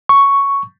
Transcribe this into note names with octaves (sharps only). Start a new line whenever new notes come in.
C#6